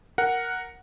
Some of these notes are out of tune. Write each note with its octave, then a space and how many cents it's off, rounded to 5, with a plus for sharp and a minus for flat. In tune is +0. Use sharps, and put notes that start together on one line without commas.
A#4 +0 F#5 +0